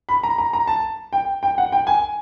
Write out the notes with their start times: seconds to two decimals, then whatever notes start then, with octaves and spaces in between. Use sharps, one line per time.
0.09 B5
0.23 A#5
0.38 A#5
0.53 A#5
0.67 A5
1.13 G5
1.43 G5
1.58 F#5
1.72 G5
1.87 G#5